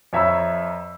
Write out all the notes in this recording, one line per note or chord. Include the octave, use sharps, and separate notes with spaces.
F2 C#5 E5 A#5 B5 E6